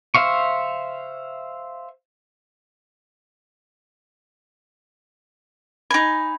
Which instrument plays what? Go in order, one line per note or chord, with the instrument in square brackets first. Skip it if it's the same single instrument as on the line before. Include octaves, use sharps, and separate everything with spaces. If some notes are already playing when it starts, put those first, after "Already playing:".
[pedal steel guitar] C5 E5 F5 C#6
[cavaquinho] D#4 G#5 [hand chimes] B5